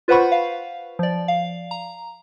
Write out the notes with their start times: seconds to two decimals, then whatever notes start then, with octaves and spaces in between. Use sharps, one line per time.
0.08 F4 B4 C5 F#5 B5 C#6
0.32 F5
0.99 F3 D5
1.28 F5
1.71 A#5